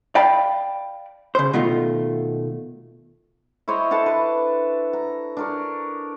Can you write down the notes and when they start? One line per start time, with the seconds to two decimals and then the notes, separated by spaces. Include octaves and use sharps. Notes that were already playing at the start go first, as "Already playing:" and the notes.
0.15 D5 F5 G5 A5 B5
1.35 C#3 C5
1.53 B2 D#3 A3 F4
3.68 E4 C5 C#5 D#5
3.91 D4 A4 B4 A5
4.06 B4
4.93 A#5
5.37 D4 A#4 C#5